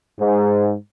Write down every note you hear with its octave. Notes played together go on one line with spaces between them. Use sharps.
G#2